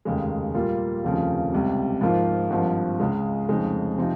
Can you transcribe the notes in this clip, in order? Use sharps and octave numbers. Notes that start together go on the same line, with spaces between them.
F1 D#2 C#3 G#3
A#2 G3 A#3 F4
F1 D#2 C#3 F3 C4
C#2 C3 G3
G#2 F3 A#3 F4
G#1 G2 F3
C#2 C#3 G#3
F1 F2 C#3 G#3 D#4
C3 F3 C4 D#4